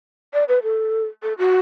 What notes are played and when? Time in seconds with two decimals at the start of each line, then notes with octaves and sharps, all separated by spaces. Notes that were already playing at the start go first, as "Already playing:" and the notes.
0.34 D5
0.48 B4
0.63 A4
1.23 A4
1.38 F#4